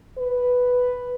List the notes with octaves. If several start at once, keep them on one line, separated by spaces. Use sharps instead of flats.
B4